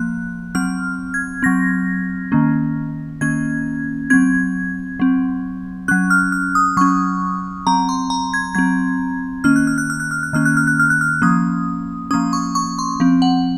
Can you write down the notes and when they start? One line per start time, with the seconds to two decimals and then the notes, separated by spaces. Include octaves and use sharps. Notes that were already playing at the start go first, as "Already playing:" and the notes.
Already playing: F3 A#3 F#6
0.55 F#3 C4 F6
1.14 G#6
1.43 F#3 C4 A#6
2.32 D#3 A#3 C#4
3.21 D#3 A#3 C#4 G#6
4.10 F#3 C4 G#6
5.00 F#3 C4
5.88 F#3 C#4 F#6
6.10 F6
6.32 F6
6.55 D#6
6.77 F#3 C#4 C#6
7.67 F#3 C4 A#5
7.89 C6
8.10 A#5
8.34 G#6
8.55 F#3 C4 G#6
9.44 D#3 A#3 C#4 F6
9.56 F#6
9.67 F6
9.78 F#6
9.90 F6
10.00 F#6
10.11 F6
10.23 F#6
10.33 D#3 A#3 C#4 F6
10.45 F#6
10.57 F6
10.67 F#6
10.79 F6
10.90 F#6
11.01 F6
11.22 F3 A#3 C#4 D#6
12.11 F3 A#3 C#4 D#6
12.33 C#6
12.55 C#6
12.79 C6
13.00 F3 C4
13.22 F#5